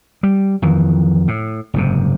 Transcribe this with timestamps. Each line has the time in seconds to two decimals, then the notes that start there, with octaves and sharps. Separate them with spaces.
0.23 G3
0.62 F2 D#3 E3
1.28 A2
1.74 F#1 G#2 C3